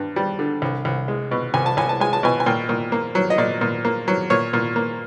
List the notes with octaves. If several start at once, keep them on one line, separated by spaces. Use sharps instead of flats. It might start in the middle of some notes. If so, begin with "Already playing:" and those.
Already playing: G2
G3
D3
C2
C2
G#3
B2
C2 G#5
A5
C2 G#5
A5
G#3 G#5
A5
B2 G#5
G#5
A#2 G5
A#2
A#3
F#3
D#5
A#2 D5
A#2
A#3
F#3
A#2 C#5
A#2
A#3